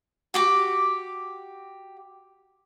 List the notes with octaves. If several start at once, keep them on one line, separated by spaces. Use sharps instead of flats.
F#4 G4 D6